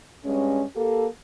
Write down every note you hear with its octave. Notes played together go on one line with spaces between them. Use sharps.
G2 G#3 C#4
A#3 G4 A4